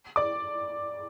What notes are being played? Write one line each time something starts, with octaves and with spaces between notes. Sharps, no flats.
D5 D6